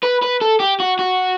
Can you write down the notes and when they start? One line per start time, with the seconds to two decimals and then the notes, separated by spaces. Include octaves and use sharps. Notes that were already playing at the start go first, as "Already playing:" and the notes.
0.03 B4
0.22 B4
0.41 A4
0.60 G4
0.80 F#4
0.99 F#4